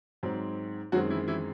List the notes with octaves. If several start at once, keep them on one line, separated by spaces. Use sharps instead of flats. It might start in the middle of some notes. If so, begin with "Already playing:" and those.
G#2 F#3 C4
F#2 D#3 F#3 G#3 C4 F#4
E3 E4
E3 E4